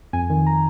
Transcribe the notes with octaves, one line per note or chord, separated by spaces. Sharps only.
F2 G#5
D#3
A#5